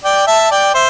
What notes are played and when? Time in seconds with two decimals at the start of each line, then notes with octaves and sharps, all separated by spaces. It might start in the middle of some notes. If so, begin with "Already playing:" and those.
0.04 D5 G5
0.27 E5 A5
0.51 D5 G5
0.74 C5 E5